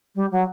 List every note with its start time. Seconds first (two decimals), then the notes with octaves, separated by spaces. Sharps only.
0.15 G3
0.31 F#3